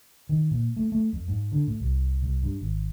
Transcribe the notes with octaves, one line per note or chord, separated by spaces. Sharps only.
D#3
A#2
A3
A3
F2
G#2
D3
A2
C2
C2
G2
G#1